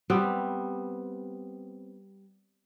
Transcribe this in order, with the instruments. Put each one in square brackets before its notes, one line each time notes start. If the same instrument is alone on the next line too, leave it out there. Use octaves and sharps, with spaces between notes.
[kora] G3 B3 C4